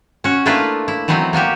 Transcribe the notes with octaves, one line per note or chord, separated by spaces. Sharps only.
C#4 F#4
A3 A#3 D4 E4 F4 B4
E4
E3 F#3 B3 C4 D#4
A#3 B3 F#4 G4